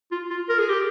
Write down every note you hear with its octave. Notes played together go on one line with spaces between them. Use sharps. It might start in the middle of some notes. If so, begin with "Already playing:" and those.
F4
F4
A#4
G#4
G4